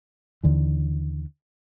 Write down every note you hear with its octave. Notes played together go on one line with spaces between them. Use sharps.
D#2 D3 E3